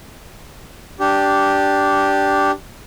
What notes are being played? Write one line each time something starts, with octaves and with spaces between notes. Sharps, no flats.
D4 G4